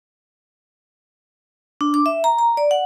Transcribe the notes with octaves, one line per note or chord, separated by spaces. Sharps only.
D4
D6
E5
A#5
A#5
D5
F#5